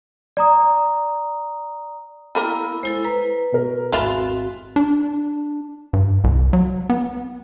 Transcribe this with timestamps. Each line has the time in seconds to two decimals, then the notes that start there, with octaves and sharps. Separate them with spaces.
0.37 D5 A#5 D#6
2.35 G3 A#3 B3 E4 A#4
2.83 G#3 E4 A4 C5
3.05 B4 A#5
3.52 B2 B3 A#4
3.93 G#1 E3 G#3 C4 F4 F#4 B5 F7
4.76 D4
5.93 G2
6.24 C2
6.53 F#3
6.90 B3